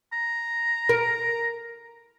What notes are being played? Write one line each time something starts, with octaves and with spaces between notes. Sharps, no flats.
A#5
A#4